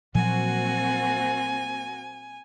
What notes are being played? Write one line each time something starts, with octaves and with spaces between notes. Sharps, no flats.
A#2 F3 F#3 A#3 C4 F#4 G#5